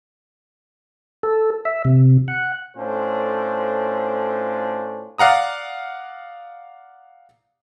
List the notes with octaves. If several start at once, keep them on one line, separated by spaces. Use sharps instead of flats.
A4
E5
C3
F#5
A2 C#4 D4 F4 A4 C5
D5 F5 F#5 A#5 D#6